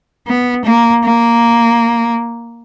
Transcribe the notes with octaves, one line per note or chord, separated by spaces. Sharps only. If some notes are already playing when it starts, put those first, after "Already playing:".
B3
A#3
A#3